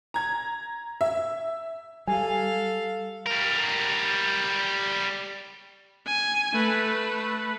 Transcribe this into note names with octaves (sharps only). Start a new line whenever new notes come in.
A#5 G#6
E5
G3 A4 F5 G#5
G3 A#4
G#5
A3 B4